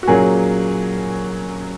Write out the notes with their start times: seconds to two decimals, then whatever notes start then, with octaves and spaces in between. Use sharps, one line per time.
0.03 F#4
0.08 A#2 F#3 A#3 C#4 G#4